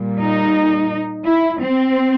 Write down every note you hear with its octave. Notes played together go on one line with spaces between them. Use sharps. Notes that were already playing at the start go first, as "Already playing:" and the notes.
Already playing: A#2 G3
D#4
E4
C4